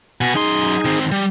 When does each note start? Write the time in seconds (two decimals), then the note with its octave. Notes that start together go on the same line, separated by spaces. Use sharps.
0.21 B2 F#5 G#5
0.35 F#2 D#4 G#4 C6
0.85 D#3 C4
1.12 G3